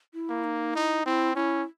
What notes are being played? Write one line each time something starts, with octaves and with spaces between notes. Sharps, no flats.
E4
A#3
D#4
D#4 E4
C4 E4
C#4 E4